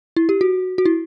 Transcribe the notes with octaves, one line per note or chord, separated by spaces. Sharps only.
E4
G4
F#4
F#4
E4